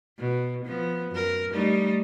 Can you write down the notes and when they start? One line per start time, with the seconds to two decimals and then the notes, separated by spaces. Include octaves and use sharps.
0.19 B2
0.65 F3 B3
1.10 F#2 A#4
1.51 G3 A3 D#4